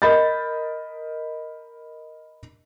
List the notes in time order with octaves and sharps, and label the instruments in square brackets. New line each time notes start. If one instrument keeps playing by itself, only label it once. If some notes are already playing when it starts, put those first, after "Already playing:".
[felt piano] A#4 D#5 B5 G6 A6